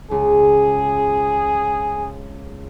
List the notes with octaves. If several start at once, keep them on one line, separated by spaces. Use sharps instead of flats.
C#2 G#4